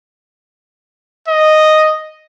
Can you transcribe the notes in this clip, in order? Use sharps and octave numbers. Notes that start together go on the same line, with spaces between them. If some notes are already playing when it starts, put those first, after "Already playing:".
D#5